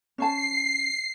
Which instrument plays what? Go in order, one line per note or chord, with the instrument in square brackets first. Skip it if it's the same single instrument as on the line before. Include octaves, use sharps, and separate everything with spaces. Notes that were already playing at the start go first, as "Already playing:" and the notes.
[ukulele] C#4 C5 A5 [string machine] C7